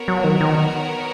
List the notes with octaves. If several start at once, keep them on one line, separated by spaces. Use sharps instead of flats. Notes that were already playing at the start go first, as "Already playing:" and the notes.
Already playing: B3 F#4 A#4 C#5
F#3
D#3
D#3